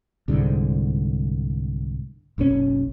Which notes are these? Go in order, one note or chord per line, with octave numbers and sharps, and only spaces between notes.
C2 G#2 D3
F#1 B1 B2 C#4